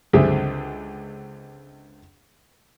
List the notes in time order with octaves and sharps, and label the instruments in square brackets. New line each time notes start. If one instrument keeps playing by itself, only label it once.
[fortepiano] C#2 D3 C4 G4 G#4 E5